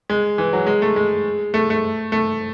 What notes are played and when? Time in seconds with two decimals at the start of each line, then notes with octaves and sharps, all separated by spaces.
0.10 G#3
0.38 E3
0.53 F#3
0.66 G#3
0.82 A3
0.96 G#3
1.54 A3
1.70 A3
2.12 A3